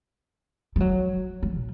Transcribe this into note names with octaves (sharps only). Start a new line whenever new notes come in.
G3
F#3
G3
A#2